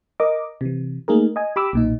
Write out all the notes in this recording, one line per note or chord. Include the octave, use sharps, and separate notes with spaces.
A#4 D#5 D6
C3 E3
A3 A#3 D#4 G#4 A#4
D#5 G#5
G4 B5 D6 E6
B1 A#2 D#4